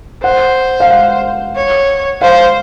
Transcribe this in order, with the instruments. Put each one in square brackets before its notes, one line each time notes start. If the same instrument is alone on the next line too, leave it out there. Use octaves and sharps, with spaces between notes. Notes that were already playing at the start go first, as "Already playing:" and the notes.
[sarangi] C5 [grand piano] F#5
[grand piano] F5
F#5
[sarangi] C#5
[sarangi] C5 [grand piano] F5